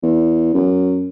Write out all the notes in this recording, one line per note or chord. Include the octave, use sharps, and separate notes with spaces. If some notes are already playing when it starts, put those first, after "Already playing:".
E2
F#2